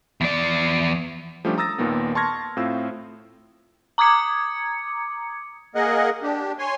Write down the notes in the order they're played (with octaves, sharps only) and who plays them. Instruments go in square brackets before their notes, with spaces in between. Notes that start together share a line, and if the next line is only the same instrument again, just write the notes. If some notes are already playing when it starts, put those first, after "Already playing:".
[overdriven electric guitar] E2 D5
[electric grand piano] F3 G3 A3 C#4 D4 G4
A#5 D#6 E6 A6 A#6
D#2 A#2 D#3 A#3 B3
A5 C6 C#6 F6 G#6 A#6
A2 C4 F4 F5 E6
[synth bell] A#5 D6 D#6 G#6 C#7
[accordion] A#3 G#4 A#4 D#5 F#5
D4 G4
C#5 G#5 C6